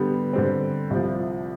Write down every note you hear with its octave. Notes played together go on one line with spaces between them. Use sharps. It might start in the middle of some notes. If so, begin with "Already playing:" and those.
Already playing: D3 G3 B3
D3 G3 C4
C2 C3 F3